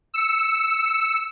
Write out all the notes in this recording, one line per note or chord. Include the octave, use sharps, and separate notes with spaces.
E6 C#7